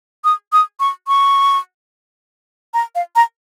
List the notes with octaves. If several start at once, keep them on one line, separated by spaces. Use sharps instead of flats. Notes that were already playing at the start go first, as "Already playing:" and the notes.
D#6
D#6
C#6
C#6
A#5
F5
A#5